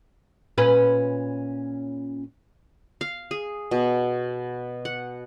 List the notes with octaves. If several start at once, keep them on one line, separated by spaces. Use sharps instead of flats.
A#2 C#4 B4
F5
G#4
B2
F#5